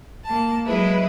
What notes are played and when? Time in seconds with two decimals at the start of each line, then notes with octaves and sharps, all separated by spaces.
0.24 A#3 A5
0.65 F#3 G#3 E4 B4